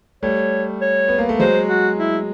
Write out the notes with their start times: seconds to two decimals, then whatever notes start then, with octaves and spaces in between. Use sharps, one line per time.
0.23 G3 A3 C#5
0.81 C#5
1.08 B3
1.18 A#3
1.29 A3
1.40 F#3 G#3 C5
1.69 F#4
1.98 E4